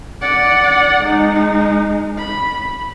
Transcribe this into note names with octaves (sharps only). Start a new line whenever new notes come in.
D5 F#5
G#3 D#4
B5